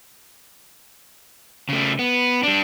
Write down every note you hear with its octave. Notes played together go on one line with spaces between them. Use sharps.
C#3 A3
B3
G3 D4